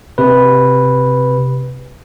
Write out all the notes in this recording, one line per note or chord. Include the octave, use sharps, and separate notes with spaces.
C3 B4